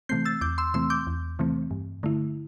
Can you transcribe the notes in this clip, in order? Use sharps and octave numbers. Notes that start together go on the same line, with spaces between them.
C3 E3 A3 C4 G6 C7
E6 A6
E2 D6 G6
C6 E6
C3 E3 A3 C4 C6 E6
D6 G6
E2
C3 E3 A3 C4
G2
D3 A3 E4